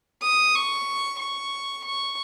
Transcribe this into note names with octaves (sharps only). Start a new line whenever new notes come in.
D#6
C#6
C#6
C#6